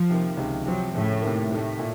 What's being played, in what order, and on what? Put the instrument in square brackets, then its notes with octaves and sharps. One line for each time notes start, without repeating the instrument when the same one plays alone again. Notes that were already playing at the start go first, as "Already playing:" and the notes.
Already playing: [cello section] F3
[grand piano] C3 D#3 A#3
C#2 C3 D#3
[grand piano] C3 F3 C4 [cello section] F#3
[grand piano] F2 C#3 A3 [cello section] A2
[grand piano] C3 D#3 A#3
[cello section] A2 [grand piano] C3 D#3 A3
[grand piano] A#2 A3